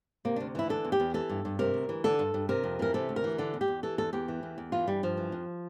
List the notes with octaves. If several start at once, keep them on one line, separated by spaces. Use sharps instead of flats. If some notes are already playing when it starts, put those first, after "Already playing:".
C3 A#3
D2 D4
E3 E4
D3 A4
E2
G4
E2
E3 A4
G2
G2
C3 A#4
D2
E3
D3 A4
G2
G2
C3 A#4
F2
E3 A#4
C3 A4
D2
A#4
E3
D3 A4
E2
G4
E2
E3 A4
E2 A4
E2 G4
E3
E2
E2
E3 F4
G2 G3
G2 F3
E3
F2